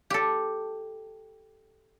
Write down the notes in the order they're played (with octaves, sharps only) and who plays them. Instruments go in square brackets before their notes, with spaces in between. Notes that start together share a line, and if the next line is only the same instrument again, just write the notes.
[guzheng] G4 A4